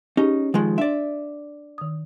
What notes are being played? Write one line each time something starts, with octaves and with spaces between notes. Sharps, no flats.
C#4 D#4 G4 G#4
D#3 F3 G#3
D4 D5 E5
D#3 D#6